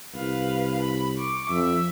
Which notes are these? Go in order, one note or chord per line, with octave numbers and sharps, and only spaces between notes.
C2 B4 F5
B5
C#6 D6
F2 E5